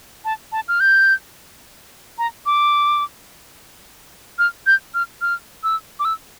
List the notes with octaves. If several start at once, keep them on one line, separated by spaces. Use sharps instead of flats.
A5
A5
F6
G6
A#5
D6
F6
G6
F6
F6
E6
D6
E6